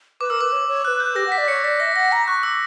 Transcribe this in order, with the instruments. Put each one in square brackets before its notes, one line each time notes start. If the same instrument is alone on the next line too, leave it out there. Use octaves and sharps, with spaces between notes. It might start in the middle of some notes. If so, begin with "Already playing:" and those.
[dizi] B4 [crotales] D6
[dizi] A#4 [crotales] E6
[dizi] B4 [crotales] D6
[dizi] C#5
C#5
[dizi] B4 C#5 [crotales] F#6
[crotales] G6
[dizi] G4 [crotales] A#6
[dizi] F#5
[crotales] B6
[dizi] D5
[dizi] C#5 [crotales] C#7
[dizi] D5 [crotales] B6
[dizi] E5 [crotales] A#6
[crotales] B6
[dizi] F#5 [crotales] A#6
[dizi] A#5 [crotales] A#6
[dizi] C#6 [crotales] F#6
[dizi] D6 [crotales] E6